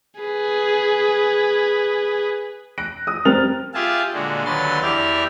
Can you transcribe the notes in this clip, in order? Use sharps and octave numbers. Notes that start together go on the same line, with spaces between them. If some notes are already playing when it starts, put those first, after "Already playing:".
G#4 B4
F#6 A#6 D7
D#6
G3 C4 A#4 F6 A6 F7
F4 G4 G#4 E5 F5 A5
A#2 D3 G#3 F#4
D#2 D3 F#3 B4 C6 A6
E2 E4 G4 D5 E5 F6